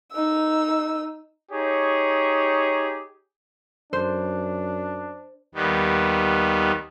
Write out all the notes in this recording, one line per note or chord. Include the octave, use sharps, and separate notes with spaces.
D#4 E6
D#4 G4 G#4 C#5
F#2 D4 C5
D#2 D#3 G3 B3